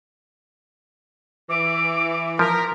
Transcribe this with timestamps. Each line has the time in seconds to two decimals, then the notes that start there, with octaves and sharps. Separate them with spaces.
1.49 E3 D6
2.39 F3 A#4 B6